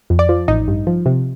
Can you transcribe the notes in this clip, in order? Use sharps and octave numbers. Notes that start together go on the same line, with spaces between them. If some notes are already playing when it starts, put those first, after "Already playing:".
F2
D5
F3
A1 D#4
G2
F3
C3